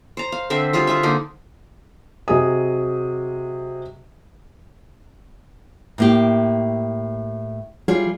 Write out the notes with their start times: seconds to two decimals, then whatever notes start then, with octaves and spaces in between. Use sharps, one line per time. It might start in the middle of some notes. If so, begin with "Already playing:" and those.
0.17 C5 A#5
0.32 F5
0.50 D3 C4 C5 E5
0.73 G3 F4 G#4 C5
0.87 F4 G#4 E5
1.03 D3 A#3 D#4
2.28 C3 F#3 G#4 D#5 D#6
5.98 A2 A#3 G4
7.88 F#3 G3 F4 G#4